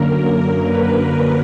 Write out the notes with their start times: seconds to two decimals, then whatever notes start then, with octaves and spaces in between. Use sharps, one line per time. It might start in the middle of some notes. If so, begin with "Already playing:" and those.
Already playing: F#2 D3 F#3 A#3 A#4
0.18 A#4
0.63 B4
1.09 A#4